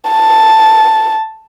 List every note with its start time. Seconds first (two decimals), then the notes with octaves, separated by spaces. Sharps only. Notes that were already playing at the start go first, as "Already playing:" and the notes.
0.11 A5